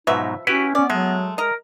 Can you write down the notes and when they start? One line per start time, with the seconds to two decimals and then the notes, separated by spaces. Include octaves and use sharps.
0.07 G#2 B2 F3 F#3 D#4 B4 E5
0.47 B3 C#4 E4 F#4 G4 B4 F#5
0.75 B3 C#4 D5
0.90 F#3 G#3 A3
1.38 A#4 D#5 A#5